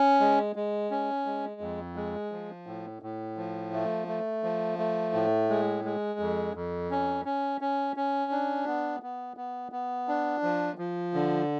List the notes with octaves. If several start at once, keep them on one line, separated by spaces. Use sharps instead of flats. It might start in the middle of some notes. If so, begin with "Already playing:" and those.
Already playing: C#4
G#3
G#3
C#4
G#3
F2
G#3
F3
A2
A2
F3
A3
A3
F3
A3
A2
G#3
G#3
F2
F2
C#4
C#4
C#4
C#4
D4
B3
B3
B3
B3
D4
F3
F3
D3